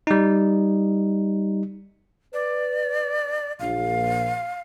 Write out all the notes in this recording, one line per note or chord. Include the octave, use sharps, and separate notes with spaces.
G3 D#4
B4 D5
A#1 F5